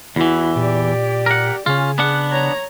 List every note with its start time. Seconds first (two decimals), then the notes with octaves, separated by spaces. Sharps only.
0.16 E2 E3 E4 F#4
0.56 A#2 G4 D5
1.26 A#4 F#5
1.66 C#3 C#4 F4 G#4
1.98 B3 D4 F#5
2.31 C#5 A#5